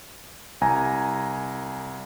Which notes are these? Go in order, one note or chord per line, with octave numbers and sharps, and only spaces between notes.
C2 G#5 A#5